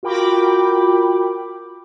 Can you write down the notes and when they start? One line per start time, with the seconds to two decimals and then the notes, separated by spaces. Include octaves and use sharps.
0.03 F4 F#4 A#4 G5 B5 D6